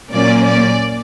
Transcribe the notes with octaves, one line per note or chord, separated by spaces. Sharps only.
A#2 F#3 A#3 C#4 D5
D5